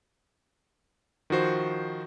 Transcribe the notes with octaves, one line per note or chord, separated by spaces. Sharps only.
D#3 F3 F#4 C5